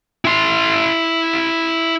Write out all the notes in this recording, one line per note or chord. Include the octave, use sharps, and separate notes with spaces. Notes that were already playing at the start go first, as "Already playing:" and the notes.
E4 C6